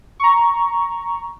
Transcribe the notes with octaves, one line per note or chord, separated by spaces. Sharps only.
A#5 C#6